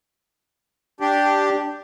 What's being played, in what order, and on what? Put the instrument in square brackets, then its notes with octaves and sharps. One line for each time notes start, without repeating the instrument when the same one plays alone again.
[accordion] D4 G4